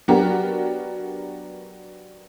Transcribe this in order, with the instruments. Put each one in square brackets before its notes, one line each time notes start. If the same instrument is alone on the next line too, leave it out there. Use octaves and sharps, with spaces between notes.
[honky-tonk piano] F#3 B3 D4 F#4 G4 A#4